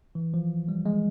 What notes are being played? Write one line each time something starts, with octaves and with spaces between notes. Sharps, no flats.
E3
F3
G3
G#3